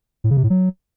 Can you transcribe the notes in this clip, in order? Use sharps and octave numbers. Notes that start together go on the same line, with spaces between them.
A2
C#3
C3
A2
F#3